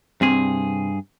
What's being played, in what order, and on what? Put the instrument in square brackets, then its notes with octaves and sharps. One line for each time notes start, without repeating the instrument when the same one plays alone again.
[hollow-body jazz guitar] C2 C4 G#5 [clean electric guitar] G2 G#4